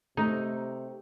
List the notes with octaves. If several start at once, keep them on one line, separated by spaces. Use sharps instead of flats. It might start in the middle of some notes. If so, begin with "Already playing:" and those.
C3 A3 D#4